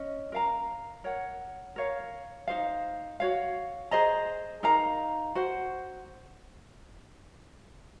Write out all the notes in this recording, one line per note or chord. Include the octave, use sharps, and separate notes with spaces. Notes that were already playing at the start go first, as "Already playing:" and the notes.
Already playing: C#4 D#5
A#4 F5 A#5
A#4 C#5 F#5
A#4 C#5 F5
D#4 G#4 C5 F5
F#4 C#5 F5
G#4 C5 D#5 A#5
D#4 A#4 F5 A#5
F#4 C5 F#5